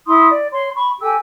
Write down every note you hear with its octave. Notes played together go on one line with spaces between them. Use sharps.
E4 C6 D#6
D5
C#5 C6
B5 C#6
G4 A4 G#5 E6